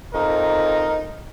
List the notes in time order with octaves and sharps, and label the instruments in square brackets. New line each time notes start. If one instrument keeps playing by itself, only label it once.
[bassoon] F2 [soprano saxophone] D#4 [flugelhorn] A#4